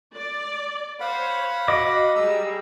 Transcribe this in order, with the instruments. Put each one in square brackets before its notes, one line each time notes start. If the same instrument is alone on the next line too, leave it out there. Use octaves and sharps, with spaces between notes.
[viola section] D5
[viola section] C5 C#5 [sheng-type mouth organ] F5 F#5 B5
[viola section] F#4 [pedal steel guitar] D#5 D6
[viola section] G3 G#4 [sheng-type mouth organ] A#5 E6